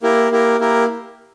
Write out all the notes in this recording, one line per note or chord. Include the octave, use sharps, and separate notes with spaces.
A#3 E4 G4 A#4
A#3 E4 G4 A#4
A#3 E4 G4 A#4